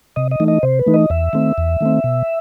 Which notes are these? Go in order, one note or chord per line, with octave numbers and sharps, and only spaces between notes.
C3 D#5
D#5
E3 A3 D#4
D#5
C3 C5
B4
E3 A3 D#4
D#5
E2 E5
D#3 A3 C4
E2
D#3 A3 C4
B2